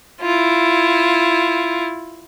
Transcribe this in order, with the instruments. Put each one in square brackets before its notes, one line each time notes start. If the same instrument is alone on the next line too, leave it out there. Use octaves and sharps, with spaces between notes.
[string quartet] E4 F4